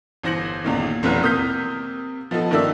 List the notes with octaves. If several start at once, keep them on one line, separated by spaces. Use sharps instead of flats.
G1 E3 C5 A#6 C#7 F#7
G1 E2 A#2 D#3
F1 B1 A#2 E3 F#3 B4
C3 A#3 D#6 F6 G6 B6
F3 B3 D#4 A4
G2 D#3 A#3 D5 E5 E6